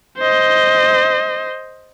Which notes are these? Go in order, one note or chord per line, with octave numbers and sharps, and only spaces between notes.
C5 D#5